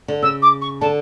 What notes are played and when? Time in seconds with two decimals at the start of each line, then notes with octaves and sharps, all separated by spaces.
0.08 D3
0.22 C#3 E6
0.42 D6
0.61 C#6
0.81 D3 A5